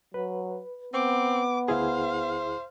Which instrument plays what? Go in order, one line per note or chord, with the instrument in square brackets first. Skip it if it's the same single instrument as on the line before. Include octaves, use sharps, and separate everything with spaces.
[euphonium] F#3 [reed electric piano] B4
[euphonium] B3 [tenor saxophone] C4 [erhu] D6
[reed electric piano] D2 E4 G#4 [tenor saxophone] C5 [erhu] F5